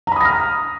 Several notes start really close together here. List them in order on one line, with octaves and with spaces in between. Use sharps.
A#5 B5 D#6 A#6 F6